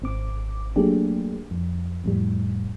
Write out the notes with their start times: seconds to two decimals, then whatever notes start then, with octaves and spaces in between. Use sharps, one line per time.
0.02 G#1 C4 D6
0.76 F#3 A3 A#3 D4 G4 G#4
1.51 F2
2.04 F2 A2 G3